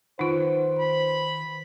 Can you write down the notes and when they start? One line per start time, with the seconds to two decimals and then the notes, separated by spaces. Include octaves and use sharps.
0.19 D#3 D#4 F4 B4 C5 F#5
0.79 B5